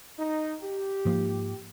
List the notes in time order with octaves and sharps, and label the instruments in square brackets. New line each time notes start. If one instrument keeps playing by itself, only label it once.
[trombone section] D#4
G4
[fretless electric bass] G#2 F3 A#3